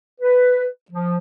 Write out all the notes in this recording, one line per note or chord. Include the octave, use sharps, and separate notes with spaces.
B4
F3